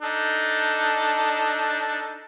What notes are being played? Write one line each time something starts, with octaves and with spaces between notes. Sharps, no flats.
D4 D#4 A4